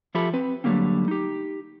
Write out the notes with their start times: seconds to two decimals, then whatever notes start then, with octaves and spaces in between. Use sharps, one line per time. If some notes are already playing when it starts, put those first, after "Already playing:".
0.15 F3 F4 G4 A4 E5 B5
0.34 C4 B4
0.64 D3 F#3 G3 A3 A#3 C4
1.08 D#4 G4